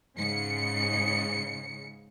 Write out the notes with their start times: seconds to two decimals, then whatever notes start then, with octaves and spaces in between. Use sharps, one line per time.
0.17 G#2 C#3 C#7